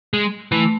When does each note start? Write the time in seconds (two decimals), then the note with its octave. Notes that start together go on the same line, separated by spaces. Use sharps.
0.13 G#3
0.52 E3 A3